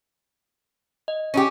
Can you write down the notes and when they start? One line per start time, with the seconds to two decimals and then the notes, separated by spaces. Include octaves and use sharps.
1.08 D#5
1.34 C#4 D#4 G4